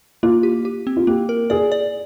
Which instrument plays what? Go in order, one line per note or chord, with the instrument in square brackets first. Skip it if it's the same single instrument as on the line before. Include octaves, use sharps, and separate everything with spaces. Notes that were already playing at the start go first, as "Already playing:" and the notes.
[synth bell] A#3 [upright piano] F4
[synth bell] G4
G4
C4
[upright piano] F4
[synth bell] A#3 [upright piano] G4
[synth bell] A#4
[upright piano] G#4 [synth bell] D5
[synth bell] D5